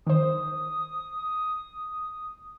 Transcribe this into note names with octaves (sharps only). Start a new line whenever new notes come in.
D#3 C5 D#6